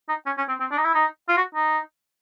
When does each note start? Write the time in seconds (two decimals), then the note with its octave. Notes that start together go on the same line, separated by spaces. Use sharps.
0.09 D#4
0.26 C#4
0.37 C#4
0.49 C4
0.60 C4
0.71 D4
0.77 D#4
0.85 E4
0.95 D#4
1.28 F4
1.37 F#4
1.55 D#4